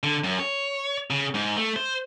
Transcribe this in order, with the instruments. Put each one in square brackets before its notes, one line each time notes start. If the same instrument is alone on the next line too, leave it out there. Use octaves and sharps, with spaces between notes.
[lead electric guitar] D3
F#2
C#5
C#3
G#2
A3
C5